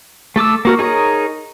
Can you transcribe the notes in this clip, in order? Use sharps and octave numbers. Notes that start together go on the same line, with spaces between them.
A3 A4 D6 E6
A#3 F#4 A#4
D#4 G#4 A#4 C#5